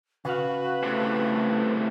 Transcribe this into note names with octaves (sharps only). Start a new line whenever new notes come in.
C#3 F#4 B4 F5
A2 C3 A3